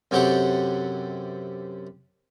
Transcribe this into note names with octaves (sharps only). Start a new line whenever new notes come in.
F#2 C3 F#3 G4 A4 F#5